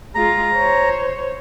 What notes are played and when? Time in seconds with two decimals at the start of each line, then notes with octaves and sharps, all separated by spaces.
0.15 G#3 F4 A#5
0.54 C5 C#5